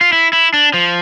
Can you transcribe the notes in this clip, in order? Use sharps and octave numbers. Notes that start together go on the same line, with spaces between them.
F4
E4
E4
D4
F3